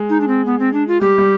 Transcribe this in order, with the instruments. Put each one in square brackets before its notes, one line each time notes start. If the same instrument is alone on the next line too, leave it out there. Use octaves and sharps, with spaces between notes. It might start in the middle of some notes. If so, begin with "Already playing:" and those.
Already playing: [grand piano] G#3
[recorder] D#4
D4
C4
B3
C4
D4
F4
[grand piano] G3 [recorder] G4
[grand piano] G3